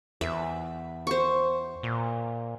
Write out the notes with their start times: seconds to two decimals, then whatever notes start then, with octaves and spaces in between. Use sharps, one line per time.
0.21 E2 E5
1.07 C5 C#6
1.83 A#2